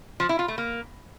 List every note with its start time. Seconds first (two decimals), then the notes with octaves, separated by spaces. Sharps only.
0.20 F3
0.29 E4
0.39 F4
0.48 A3
0.58 A#3